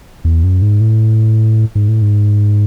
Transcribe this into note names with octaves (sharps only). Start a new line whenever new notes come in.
E2
F#2
G#2
A2
G#2
A2
G#2